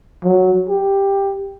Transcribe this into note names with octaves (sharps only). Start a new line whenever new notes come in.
F#3
G4